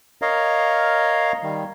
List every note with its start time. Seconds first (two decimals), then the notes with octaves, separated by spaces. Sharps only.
0.22 A#4 C#5 D#5 F5 A#5
1.42 D#3 G3